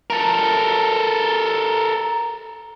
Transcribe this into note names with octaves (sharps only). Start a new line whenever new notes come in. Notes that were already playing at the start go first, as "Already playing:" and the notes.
A4 A#4